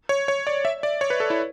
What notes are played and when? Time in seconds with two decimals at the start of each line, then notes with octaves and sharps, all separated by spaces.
0.09 C#5
0.28 C#5
0.47 D5
0.65 E5
0.83 D5
1.01 C#5
1.10 B4
1.20 A4
1.30 E4